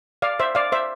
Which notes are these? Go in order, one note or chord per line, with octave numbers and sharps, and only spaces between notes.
D5 F5
C5 E5
D5 F5
C5 E5